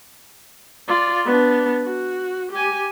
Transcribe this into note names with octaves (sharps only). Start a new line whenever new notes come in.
F4 D5
B3 D4
F#4
G4 G#5